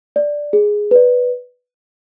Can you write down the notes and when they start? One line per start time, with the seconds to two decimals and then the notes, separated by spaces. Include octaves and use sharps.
0.16 D5
0.53 G#4
0.91 B4 D5